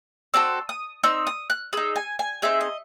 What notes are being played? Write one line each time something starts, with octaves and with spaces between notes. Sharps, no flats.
C4 F#4 A4 E6
D#6
C4 D#4 E6
D#6
F#6
D#4 G#4 E6
G#5
G#5
C4 D#4 G#4 E5
D#5